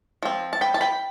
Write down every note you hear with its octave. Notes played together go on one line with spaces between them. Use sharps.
F3 C4
A5
G5 B5
A5
G5 B5